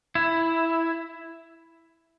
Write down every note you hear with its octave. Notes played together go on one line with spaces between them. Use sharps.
E4